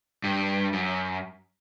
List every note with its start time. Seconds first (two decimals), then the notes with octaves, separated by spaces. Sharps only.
0.24 G2
0.73 F#2